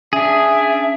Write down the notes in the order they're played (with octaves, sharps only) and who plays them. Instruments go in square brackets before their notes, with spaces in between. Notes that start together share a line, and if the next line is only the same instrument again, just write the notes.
[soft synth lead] C#4 [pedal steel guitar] D4 G#4 [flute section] E5